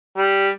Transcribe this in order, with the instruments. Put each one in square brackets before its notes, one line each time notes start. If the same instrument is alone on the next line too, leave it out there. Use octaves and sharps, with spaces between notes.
[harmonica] G3